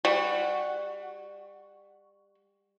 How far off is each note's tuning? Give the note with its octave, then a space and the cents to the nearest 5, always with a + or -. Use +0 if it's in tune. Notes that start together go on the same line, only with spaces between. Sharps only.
G3 +25 F#4 +0